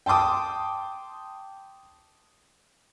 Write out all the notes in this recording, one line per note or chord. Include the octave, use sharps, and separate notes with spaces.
G5 A5 C6 D6 D#6